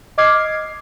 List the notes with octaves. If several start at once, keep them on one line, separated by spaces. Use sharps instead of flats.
D#5 D6 F6 G#6 C7